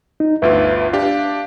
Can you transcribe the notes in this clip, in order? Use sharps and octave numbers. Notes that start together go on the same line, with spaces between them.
D#4
G1 D2 F4 B4 E5
D4 G4 F5